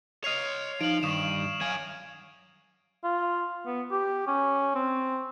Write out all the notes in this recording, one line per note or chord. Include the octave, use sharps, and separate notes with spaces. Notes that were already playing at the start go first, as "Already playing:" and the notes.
C#5 D#5 F6 C7 F7
F3 D#4 F5 D7 F#7
G2 D#3 C#6 D#6 E7
F#3 F5 G#5 G#6
F4
B3
G4
C#4
C4